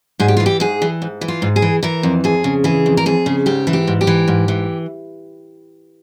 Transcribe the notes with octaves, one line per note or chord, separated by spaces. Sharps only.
G#2 G#4
G4
E3 F4
G4
G#2 G#4
E3
G#2
E3
F4
G#2
G#4
E3
E3 A#4
F2
F2 G#4
C#3
E3 G#4
F2
A#4
F2 G#4
C#3
G#2 G4
E3
G4
G#2
G4
E3
G#2
E3